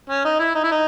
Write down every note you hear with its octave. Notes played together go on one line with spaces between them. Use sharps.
C#4
D#4
E4
D#4
E4
D#4